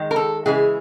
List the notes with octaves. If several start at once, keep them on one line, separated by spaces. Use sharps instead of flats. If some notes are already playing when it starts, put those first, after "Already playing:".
Already playing: D#3 G#3
A#4
A4
C#3 E3 G#3 G#4